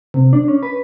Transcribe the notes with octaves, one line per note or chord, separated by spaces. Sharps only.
C3
D4
C#4
B4